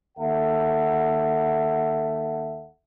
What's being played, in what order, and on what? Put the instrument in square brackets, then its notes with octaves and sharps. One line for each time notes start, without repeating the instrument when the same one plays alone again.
[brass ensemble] D#2 A4 E5 F#5